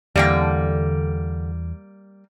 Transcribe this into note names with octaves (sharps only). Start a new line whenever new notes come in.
E2 D3 G3 A#3 G5